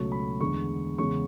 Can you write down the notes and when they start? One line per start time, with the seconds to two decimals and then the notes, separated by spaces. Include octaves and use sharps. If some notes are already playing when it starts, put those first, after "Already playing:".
Already playing: C#2 B2 F#3 A3 C#6
0.12 B5
0.40 E2 D3 G#3 B3 C#6
0.98 E2 C#3 G#3 B3 C#6